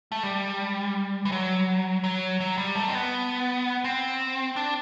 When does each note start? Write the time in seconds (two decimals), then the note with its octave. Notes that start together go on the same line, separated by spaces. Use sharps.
0.12 A3
0.23 G3
1.25 E3
1.32 F#3
2.04 F#3
2.40 F#3
2.58 G3
2.76 A3
2.87 C4
2.95 B3
3.84 C4
4.56 D4